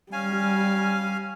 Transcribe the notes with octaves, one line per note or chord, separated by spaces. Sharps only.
G3 C#4 F5 G#5